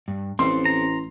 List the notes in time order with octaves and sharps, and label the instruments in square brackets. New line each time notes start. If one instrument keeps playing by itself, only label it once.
[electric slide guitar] G2
[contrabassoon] A1 [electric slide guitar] C4 A4 C5 [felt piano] C6
[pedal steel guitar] A#5